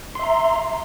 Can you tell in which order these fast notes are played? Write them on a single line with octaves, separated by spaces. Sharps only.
C6 E5 A#5